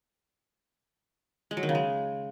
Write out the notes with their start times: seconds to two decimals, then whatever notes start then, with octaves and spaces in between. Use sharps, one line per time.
1.51 G#3
1.57 F#3
1.63 D#3
1.69 C#3
1.75 G#3